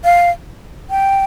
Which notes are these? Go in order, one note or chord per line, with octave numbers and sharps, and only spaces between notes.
F5
G5